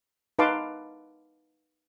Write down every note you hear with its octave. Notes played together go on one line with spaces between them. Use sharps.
D#4 B4 F5 A5 C6 D6